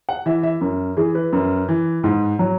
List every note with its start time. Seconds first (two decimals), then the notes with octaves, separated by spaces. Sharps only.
0.09 F#5
0.26 E3 E5
0.43 E5
0.61 F#2
0.97 E3 G#4
1.15 B4
1.33 F#2
1.68 E3
2.04 G#2
2.39 F#3